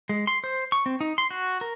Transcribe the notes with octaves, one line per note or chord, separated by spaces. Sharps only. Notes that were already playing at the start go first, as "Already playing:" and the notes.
G#3
C6
C5
C#6
C4
D#4
C6
F#4
A#4